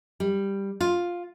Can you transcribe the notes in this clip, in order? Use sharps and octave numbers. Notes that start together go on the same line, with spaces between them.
G3
F4